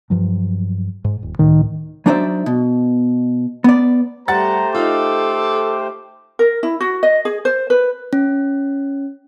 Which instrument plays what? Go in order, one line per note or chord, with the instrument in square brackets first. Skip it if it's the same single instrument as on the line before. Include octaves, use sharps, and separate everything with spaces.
[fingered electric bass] G2 F3 F#3
G#2
D#1
[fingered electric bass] C#2 A2 [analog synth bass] D#3
[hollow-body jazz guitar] F#3 D4 D#4 C5 D5 E5
B2
B3 D5
[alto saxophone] G3 [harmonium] A3 G4 C5 [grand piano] F#5 A6 [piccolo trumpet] A#5
[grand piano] D#4 F4 [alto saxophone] A4 [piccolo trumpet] D6
[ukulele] A#4
E4
F#4
D#5
G#4
C5
B4
[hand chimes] C#4